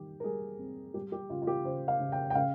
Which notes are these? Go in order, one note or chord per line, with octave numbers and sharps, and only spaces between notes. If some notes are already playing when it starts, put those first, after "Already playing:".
Already playing: D#3 G3 G4
A#4
G3 G#4
C4
G3 G4
G4
C#3 F4
F4
G4
C#3 C5
F5
C#3
G5
G5
C#3 F5